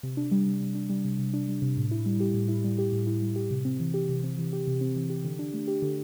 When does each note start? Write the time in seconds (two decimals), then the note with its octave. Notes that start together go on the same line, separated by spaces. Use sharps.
0.03 C3
0.17 D4
0.31 G3
0.46 C3
0.61 C3
0.75 D4
0.90 G3
1.05 C3
1.19 C3
1.33 D4
1.48 G3
1.62 C3
1.77 A2
1.91 E4
2.06 G3
2.20 G4
2.34 A2
2.49 E4
2.64 G3
2.78 G4
2.92 A2
3.07 E4
3.22 G3
3.36 G4
3.51 C3
3.65 C4
3.80 E3
3.94 G4
4.09 C3
4.24 C4
4.38 E3
4.53 G4
4.67 C3
4.81 C4
4.96 E3
5.10 G4
5.24 D3
5.39 D4
5.54 A3
5.68 G4
5.82 D3